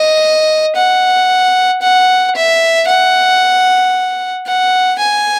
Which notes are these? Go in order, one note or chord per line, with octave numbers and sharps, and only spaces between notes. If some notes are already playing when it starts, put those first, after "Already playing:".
Already playing: D#5
F#5
F#5
E5
F#5
F#5
G#5